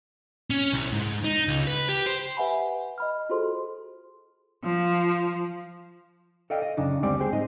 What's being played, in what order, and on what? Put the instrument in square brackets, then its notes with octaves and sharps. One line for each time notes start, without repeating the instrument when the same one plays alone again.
[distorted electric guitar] C#4
C2
G#2
D#4
C#2
B4
G4
C5
[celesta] G4 B4 E5 F#5 G#5 B5
D#5 B5 F6
F4 F#4 G#4 A4 C5 C6
[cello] F3
[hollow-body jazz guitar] A4 D5 D#5 F5 G5
D#5
F#2 C#3 D4 D#4
D2 G3 G#3 C4 D5 G5
C4 G#4 C5 G5
G#2 D#4 D#5